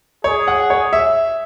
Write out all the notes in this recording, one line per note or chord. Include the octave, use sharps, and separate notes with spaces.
G#4 C#5
F#5
C#5
E5